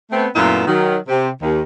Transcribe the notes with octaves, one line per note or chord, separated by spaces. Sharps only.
A3 B3 C4
F#2 A#2 A3 B3 E4 F4
D#3 F#3
C3
D#2